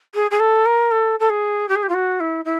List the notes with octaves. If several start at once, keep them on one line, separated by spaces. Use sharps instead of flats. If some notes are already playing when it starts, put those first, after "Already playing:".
G#4
G#4
A4
A#4
A4
A4
G#4
G4
G#4
G4
F4
F#4
E4
E4